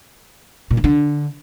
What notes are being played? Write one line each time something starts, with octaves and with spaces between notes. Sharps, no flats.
A#2
D#3
D3